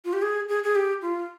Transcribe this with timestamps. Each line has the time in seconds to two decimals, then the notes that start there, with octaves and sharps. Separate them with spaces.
0.05 F4
0.13 G4
0.22 G#4
0.49 G#4
0.63 G#4
0.75 G4
1.02 F4